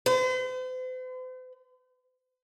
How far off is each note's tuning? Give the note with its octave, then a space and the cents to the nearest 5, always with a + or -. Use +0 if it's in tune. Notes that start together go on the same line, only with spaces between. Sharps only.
C5 -45